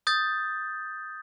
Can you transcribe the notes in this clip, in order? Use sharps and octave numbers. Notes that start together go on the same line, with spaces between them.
D#6 G6 A6